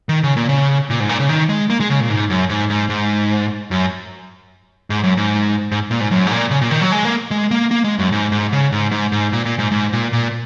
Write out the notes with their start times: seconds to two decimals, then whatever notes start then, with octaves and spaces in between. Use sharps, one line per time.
0.09 D#3
0.23 C#3
0.37 A#2
0.49 C#3
0.90 A#2
1.00 G#2
1.09 A#2
1.20 C#3
1.29 D#3
1.49 G#3
1.70 A#3
1.80 G#3
1.90 C#3
2.00 A#2
2.10 G#2
2.30 F#2
2.50 G#2
2.70 G#2
2.90 G#2
3.71 F#2
4.90 G#2
5.04 F#2
5.17 G#2
5.72 G#2
5.91 A#2
6.01 G#2
6.11 F#2
6.27 G#2
6.31 A#2
6.51 C#3
6.61 A#2
6.71 D#3
6.81 F#3
6.92 G#3
7.05 A#3
7.31 G#3
7.51 A#3
7.71 A#3
7.84 G#3
7.99 F#2
8.12 G#2
8.32 G#2
8.52 C#3
8.72 G#2
8.91 G#2
9.12 G#2
9.32 A#2
9.45 A#2
9.59 G#2
9.72 G#2
9.93 A#2
10.13 A#2